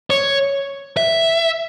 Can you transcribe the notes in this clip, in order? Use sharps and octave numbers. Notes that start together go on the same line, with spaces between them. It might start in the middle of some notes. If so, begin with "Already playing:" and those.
C#5
E5